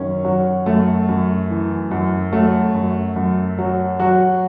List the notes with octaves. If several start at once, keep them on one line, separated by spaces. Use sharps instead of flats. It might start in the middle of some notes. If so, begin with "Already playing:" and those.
Already playing: F#2 D#3 C#4
F#3
F#2 A3
F#2
E3
F#2
F#3 A3
F#2
F#2
F#3
F#3 F#4